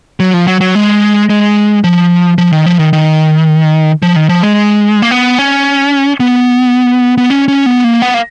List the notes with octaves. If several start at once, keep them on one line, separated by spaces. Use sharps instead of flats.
F#3
F3
F#3
F#3
G#3
G#3
F3
F3
D#3
F3
D#3
D#3
F3
D#3
F3
G#3
A#3
B3
C#4
B3
B3
C#4
C#4
B3
A#3
B3
A#3